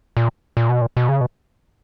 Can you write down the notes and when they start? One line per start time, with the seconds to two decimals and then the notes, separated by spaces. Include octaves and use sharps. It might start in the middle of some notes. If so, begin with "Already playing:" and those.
0.17 A#2
0.57 A#2
0.69 B2
0.81 A#2
0.97 B2
1.09 C#3
1.21 B2